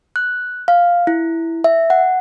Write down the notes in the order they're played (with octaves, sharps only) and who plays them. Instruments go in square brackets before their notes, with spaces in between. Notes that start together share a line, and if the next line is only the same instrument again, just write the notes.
[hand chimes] F#6
F5
E4
E5
F#5